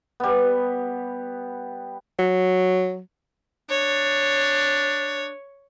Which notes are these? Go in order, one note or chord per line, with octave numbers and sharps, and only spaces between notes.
G3 B3
F#3
D4 C#5